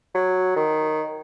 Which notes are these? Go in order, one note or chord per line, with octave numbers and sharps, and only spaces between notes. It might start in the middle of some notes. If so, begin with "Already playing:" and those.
F#3
D#3